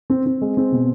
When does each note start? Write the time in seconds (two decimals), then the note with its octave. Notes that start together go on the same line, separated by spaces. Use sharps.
0.10 C4
0.26 C4
0.41 G#3
0.57 C4
0.72 B2